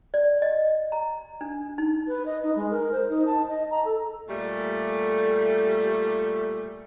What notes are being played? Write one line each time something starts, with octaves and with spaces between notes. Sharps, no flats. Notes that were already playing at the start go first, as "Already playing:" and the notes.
D5
D#5
A#5
D4
D#4
B4
D#5
D#4
G#3
A#4
C5
D#4
A5
D#5
A#5
A4
A#2 G3 A3